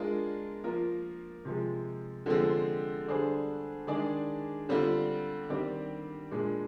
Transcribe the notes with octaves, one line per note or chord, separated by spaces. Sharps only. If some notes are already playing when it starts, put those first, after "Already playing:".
Already playing: G#3 D4 F4 A#4
F3 A#3 F4 A#4
C3 F3 G#3
D3 F3 G#3 C4
D3 G3 D4 G#4 C5
D#3 G#3 D4 G#4 D5
D3 G3 C4 F4
D#3 G3 C4 G4 D5
A#2 G#3 D4